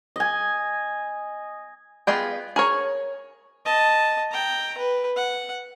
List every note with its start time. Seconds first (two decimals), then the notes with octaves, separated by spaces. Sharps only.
0.16 D#5 G#5
2.07 B3 F4 G#4 D#5 G5
2.56 G#4 A#4 C#5
3.65 D#5 A5
4.31 G5 A#5
4.78 B4
5.16 F#5